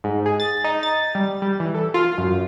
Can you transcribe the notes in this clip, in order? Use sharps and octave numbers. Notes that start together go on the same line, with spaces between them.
G#2
G#4
A6
D#4
A6
G3
G3
E3
A4
F4
F#2